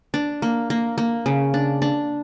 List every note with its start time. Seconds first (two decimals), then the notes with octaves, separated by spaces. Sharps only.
0.14 D4
0.42 A#3
0.70 A#3
0.98 A#3
1.26 C#3
1.54 D4
1.82 D4